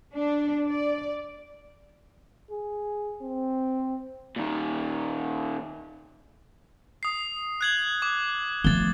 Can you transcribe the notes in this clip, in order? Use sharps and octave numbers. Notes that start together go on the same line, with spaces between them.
D4
D5
G#4
C4
A#2 D#3
D#6 C7
F#6 G#6 F#7
D6
F3 A3 A6 G7